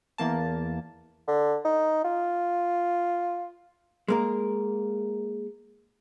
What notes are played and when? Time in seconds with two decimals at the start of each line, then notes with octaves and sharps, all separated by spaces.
0.18 E2 A#3 A5
1.28 D3
1.65 D#4
2.04 F4
4.08 G#3 A#3 A#4